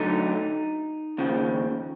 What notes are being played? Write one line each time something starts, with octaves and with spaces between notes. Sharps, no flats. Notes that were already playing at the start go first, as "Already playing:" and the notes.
Already playing: D2 D3 F#3 A3 D#4
D#2 C#3 F3